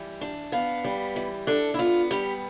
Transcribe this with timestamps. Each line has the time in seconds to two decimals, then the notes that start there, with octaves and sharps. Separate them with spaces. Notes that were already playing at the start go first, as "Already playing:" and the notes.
Already playing: E3 G3
0.21 D4
0.52 B3 F5
0.85 G3
1.16 E3
1.47 D4 A4
1.74 E4
1.79 B3 F4
2.11 G3 G4